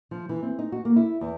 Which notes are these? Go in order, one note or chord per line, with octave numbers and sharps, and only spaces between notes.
F3
E3
C4
D#4
F#4
A#3
E4
E2